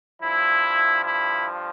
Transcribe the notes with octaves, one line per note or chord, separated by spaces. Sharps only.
G2 F3 E4
E4